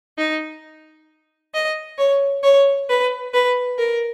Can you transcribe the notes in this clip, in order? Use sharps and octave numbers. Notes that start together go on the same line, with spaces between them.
D#4
D#5
C#5
C#5
B4
B4
A#4